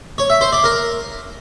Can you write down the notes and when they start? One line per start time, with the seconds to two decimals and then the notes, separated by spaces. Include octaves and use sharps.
0.18 C#5
0.30 E5
0.41 C5
0.53 D5
0.64 A#4